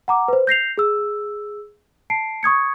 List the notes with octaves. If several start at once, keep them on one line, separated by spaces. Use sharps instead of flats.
F#5 A#5 D6
B4 C5
G6 A#6 C7 F7
G#4 E6
A5 C7 D7
C#6 D#6 G#6 C#7